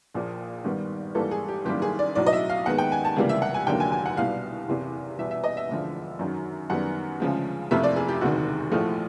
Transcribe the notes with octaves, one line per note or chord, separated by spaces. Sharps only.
A#1 A#2 F3 A#3
G#1 G2 D#3 G3 B3
G#1 G#2 E3 G3 A#3 A4
G#4
G4
F#1 F#2 D#3 G3 A#3 G4
G#4
D5
B1 A2 F#3 D5
D#5
E5
F5
D#2 D#3 G#3 B3 F#5
G5
G#5
A5
C#2 C3 E3 G3 A#3
E5
F#5
G#5
F1 D#2 D3 F#3 A#3 G5
G#5
G#5
F#5
C2 B2 G3 F5
F#1 E2 C3
E2 B2 G3 B3 E5
E5
D#5
E5
E1 D2 D3 F3
F#2 D#3 F#3
F#2 D#3 G3 B3 F#5
D2 C#3 F3 G#3
F#1 F2 C3 F3 A3 E5
D5
G#4
G4
E1 D2 C3 D#3 F#4
A#1 A2 F3 A3